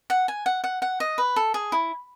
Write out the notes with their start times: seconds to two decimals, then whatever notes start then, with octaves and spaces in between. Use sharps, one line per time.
0.10 F#5
0.28 G#5
0.46 F#5
0.64 F#5
0.82 F#5
1.00 D#5
1.18 B4
1.36 A4
1.54 G#4
1.72 E4